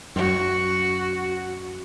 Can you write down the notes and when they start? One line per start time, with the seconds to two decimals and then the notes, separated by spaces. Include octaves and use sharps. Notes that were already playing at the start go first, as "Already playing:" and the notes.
0.16 F#2 F#4